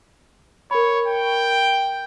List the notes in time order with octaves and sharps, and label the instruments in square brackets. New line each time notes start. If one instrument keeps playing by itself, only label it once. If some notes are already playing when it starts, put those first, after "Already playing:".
[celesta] A#4 B5 [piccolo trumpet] C#5
[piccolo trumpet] G5